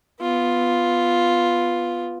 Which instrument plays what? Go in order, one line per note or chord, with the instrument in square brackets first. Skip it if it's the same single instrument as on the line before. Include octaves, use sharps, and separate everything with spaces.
[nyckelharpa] B3 F4